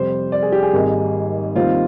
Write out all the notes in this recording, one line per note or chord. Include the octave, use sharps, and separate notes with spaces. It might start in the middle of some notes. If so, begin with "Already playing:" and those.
Already playing: F2 C3 G3 C5
D5
G#4
G4
G#4
G#1 G#2 D#3 G3 A#3
D#2 D#3 G3 C4 F4